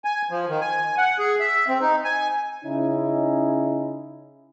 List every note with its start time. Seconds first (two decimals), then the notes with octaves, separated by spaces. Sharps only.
0.05 G#5
0.30 F3
0.49 D#3
0.61 G#5
0.98 F#5
1.19 G#4
1.40 E5
1.68 C4
1.81 D#4
2.04 G#5
2.64 C#3 C#4 D#4 E4